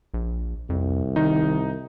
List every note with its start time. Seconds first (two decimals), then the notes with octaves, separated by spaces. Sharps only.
0.14 A#1
0.70 C2 F2
1.16 D#3 D#4